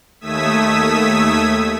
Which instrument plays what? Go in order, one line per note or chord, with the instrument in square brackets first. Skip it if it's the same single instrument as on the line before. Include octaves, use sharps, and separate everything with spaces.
[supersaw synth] D#2 A3 D#6 E6 G#6 B6